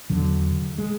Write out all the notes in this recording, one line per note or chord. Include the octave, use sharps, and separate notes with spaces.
E2 D3 F#3
C#3
G#3